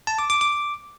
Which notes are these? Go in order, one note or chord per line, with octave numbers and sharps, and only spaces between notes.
A5
D6
D6
D6